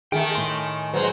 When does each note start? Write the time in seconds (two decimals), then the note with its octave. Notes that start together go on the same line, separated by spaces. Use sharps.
0.12 D#3 A3 G#4 G5 G#5
0.35 A2 C6
0.94 F#3 G#3 B4 C5